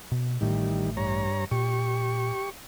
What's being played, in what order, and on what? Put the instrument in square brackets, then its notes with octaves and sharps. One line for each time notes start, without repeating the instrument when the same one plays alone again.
[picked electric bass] B2
[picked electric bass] A1 A2 A3 [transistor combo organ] D#3 G3
[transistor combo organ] G2 C#5 A#5
[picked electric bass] A#2 [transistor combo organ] G4 C#6